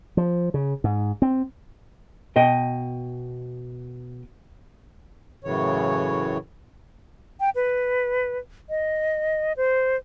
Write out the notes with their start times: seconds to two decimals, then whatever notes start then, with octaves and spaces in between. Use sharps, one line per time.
0.17 F3
0.54 C#3
0.84 G#2
1.22 C4
2.36 B2 D#5 G5
5.44 F#2 A2 C#3 E3 C#5
7.40 G5
7.56 B4
8.69 D#5
9.57 C5